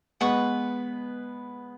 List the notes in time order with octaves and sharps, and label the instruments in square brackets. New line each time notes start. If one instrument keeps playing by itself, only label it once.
[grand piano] G#3 B3 [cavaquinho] B4 F#5 C#6